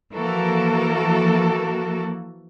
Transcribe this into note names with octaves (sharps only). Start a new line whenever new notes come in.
E3 F3 A#3 F#4 A4 A#4